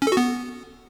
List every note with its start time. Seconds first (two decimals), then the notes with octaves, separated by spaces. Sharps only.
0.02 C#4
0.07 A4
0.12 F#4
0.17 B3